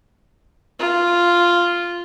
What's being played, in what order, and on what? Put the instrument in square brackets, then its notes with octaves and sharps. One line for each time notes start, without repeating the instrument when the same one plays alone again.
[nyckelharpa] F4